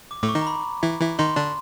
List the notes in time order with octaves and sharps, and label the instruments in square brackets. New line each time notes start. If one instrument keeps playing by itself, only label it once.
[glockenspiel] D6
[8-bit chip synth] A2 A3 [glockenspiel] D6
[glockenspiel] C#6
[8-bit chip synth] D#3 D#4
[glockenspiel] A#5
B5
[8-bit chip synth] E3 E4
E3 E4
[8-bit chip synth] D#3 D#4 [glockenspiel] C6
[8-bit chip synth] D3 D4